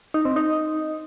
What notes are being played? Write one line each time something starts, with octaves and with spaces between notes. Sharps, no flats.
D#4
C4
D#4